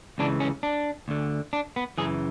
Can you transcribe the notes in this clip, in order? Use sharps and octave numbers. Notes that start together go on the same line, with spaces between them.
C#2 C#3 E3 D4
C#4
D4
D2 D3
D4
B3
F#2 C#3 E3 G#4